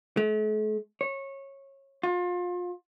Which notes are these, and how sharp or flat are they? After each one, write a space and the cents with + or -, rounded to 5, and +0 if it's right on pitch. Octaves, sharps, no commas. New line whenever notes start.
A3 -45
C#5 -20
F4 +30